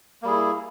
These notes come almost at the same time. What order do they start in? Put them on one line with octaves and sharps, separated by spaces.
A#3 G3 G#4 E4